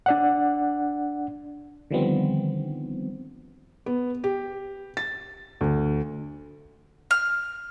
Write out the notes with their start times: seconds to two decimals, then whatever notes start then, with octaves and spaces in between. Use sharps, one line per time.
0.06 D4 D5 F#5
1.91 D3 D#3 F3 G3 B3 C4
3.86 B3
4.24 G4
4.97 A6
5.61 D2
7.11 F6